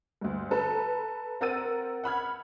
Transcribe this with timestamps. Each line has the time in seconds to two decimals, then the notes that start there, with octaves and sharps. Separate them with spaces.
0.21 D2 G2
0.51 A4 B4 A#5
1.40 C4 A#4 F#5 E6 A6 D#7
2.04 F#5 B5 F6 G#6